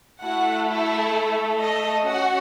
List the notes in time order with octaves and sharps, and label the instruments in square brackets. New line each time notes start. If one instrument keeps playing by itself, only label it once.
[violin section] A3 E4 F#4 A4 F#5
E4 E5
D#5
C#4 F#4 F#5